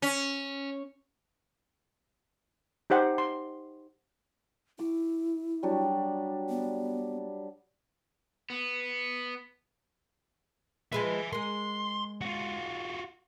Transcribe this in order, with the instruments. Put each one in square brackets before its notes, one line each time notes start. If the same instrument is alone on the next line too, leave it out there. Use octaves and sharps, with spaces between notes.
[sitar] C#4
[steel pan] D#4 G4 C5 F#5
C6
[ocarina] E4 [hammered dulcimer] D6
[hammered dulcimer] F#3 G3 D4
[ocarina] B3
[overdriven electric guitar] B3
[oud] F3 G#3 B4 [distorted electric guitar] E5 G#5
[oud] G#3 A#4 [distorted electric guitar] C6
[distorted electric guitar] F4 F#4